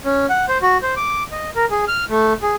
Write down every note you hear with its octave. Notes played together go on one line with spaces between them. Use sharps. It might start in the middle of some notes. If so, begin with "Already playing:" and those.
C#4
F#5
C5
F#4
C5
D6
D#5
A#4
G#4
F6
A3
G#4